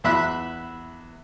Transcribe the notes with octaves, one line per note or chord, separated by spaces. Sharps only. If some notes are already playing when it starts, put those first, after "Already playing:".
E2 E5 B5 F#6